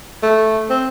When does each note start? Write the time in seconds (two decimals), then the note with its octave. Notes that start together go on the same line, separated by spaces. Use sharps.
0.23 A3
0.70 C4